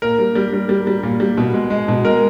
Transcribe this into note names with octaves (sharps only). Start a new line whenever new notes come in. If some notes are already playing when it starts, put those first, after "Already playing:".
A#2 A#4
G3
G3
G3
G3
G3
A#2
G3
B2
G#3
G#3
B2
G#3 A#4